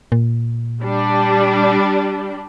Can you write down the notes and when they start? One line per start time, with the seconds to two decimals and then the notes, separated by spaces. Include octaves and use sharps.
0.12 A#2
0.82 G3 D4